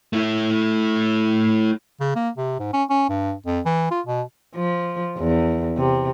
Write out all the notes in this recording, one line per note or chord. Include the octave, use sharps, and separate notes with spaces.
A3 E4
C#3
A#3
C3
G#2
C#4
C#4
G2
F2
E3
F4
B2
F3
E2
C3